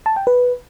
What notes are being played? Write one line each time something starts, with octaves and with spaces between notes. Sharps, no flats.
A5
G5
B4